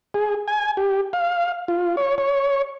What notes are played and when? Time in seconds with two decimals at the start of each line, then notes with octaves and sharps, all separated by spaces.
0.14 G#4
0.48 G#5
0.77 G4
1.13 F5
1.68 F4
1.97 C#5
2.18 C#5